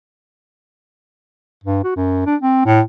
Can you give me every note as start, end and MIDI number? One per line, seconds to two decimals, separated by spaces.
1.64 1.83 43
1.84 1.96 66
1.96 2.25 42
2.26 2.36 62
2.42 2.64 60
2.66 2.81 45